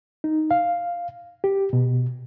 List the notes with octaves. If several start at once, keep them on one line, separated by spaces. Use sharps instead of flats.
D#4
F5
G4
B2